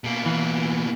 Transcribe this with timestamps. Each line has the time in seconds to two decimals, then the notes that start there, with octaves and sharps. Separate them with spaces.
0.04 B2 A#3
0.26 E3